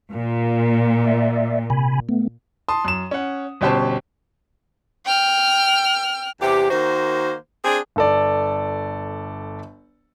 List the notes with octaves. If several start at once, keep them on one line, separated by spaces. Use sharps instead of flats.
A#2
D5 E5
C3 G#5 B5
A3 B3
A5 C6 D#6
F#2 E7
C#4 F#5
G1 B2 C#4 G4 C5 A5
G5 F6
E2 C3 G4
D#3 A#3 F#4 C5
C4 D4 G#4
G1 A4 D5